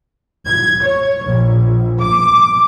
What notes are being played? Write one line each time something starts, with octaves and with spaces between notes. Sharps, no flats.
G#6
C#5
A#1
D6